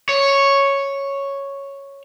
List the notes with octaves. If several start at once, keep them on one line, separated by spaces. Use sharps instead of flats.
C#5